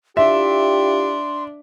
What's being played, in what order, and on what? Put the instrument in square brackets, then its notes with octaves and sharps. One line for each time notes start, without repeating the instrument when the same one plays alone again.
[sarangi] D4 [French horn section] E4 F4 G4 [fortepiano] E5 [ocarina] C6